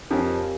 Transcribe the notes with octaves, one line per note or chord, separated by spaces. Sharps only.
F2 F3 G4 A#4 C#5 F5 G#5